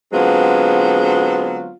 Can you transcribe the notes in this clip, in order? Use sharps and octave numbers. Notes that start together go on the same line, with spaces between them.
D3 F#3 G#3 B3 C4 F4